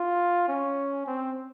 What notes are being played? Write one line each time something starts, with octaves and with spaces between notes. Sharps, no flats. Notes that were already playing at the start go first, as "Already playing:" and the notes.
Already playing: F4
C#4
C4